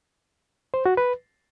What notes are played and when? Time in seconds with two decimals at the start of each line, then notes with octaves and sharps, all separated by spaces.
0.74 C5
0.86 F#4
0.97 B4